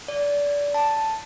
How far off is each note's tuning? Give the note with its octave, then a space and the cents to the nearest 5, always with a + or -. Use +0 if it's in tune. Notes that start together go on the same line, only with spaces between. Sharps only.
D5 -25
A5 +0